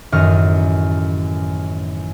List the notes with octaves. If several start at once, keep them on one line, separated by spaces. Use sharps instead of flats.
A1 F#2 D#3 D#5 F6